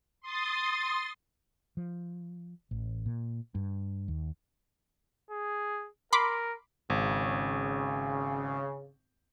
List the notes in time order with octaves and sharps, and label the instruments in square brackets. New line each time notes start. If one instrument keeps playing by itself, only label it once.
[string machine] C6 D#6 A6
[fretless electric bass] F3
A1
A#2
G2
D#2
[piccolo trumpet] G#4
[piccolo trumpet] A#4 [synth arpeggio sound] B5 C6 D6
[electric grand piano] G#1 [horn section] C#3